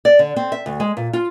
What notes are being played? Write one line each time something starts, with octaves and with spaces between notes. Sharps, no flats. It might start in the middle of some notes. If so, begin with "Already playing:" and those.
D5
D3
C4
E5
D2
G#3
A#2
F4